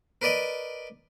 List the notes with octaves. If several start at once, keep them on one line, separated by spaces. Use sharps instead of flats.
A#4 B4 D5 D#5